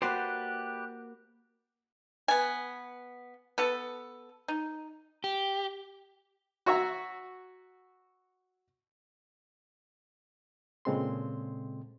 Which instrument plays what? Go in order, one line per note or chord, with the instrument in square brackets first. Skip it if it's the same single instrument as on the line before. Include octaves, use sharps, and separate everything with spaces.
[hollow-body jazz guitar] A#3 F#4 C5 [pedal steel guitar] G4 B4 D5 [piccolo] F#6
[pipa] B3 G#5
B3 A4
D#4
[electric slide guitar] G4
[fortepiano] F#4 C#5 E5 A#5
[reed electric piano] A#2 C#3 G#3 C4 A4 C6